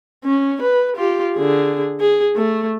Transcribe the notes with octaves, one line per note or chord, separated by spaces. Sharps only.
C#4
B4
F4 G4
D3 G#4
G#4
A3